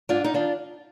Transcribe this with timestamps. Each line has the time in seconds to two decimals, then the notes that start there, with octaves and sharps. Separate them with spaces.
0.09 G#2 D4 F4
0.24 D#4
0.34 D#3 D4 F4